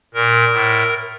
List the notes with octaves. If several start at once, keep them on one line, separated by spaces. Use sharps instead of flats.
A#2 A#4
A2